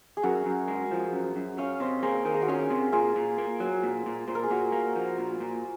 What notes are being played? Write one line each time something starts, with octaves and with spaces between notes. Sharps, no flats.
G#4
F#2 F#4 A#4
F#2
G#3
F3
F#2
F#2
C#4 C#5 F5
C3 C5 D#5
A#3 G#4 C5
D#3 A#4
G#4
F#4
C#4 F4 G#4
C3
A#2 F4 G#4
A#2
A#3
F#3
A#2
A#2
A#2 C5
A#4
G#4
A#2 F#4 A#4
A#3
F3
A#2
A#2